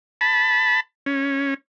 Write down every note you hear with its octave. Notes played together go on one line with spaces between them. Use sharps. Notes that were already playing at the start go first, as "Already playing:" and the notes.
A5 B5
C#4